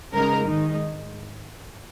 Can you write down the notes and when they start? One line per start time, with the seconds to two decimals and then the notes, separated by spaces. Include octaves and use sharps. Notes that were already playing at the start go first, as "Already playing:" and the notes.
0.13 C#3 G#3 D#4 A#4
0.48 G#2 D#3 G#3 D#4